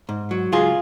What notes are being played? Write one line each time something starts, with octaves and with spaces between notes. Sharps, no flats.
G#2
F#3
C#2 F4 G#4